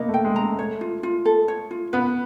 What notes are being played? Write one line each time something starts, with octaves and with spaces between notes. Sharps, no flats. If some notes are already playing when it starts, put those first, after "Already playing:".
Already playing: A#3 B3 D#5
A3
G5
G#3
A#5
A3
A3 C#5
F4
F4
A4
C#5
F4
B3 B4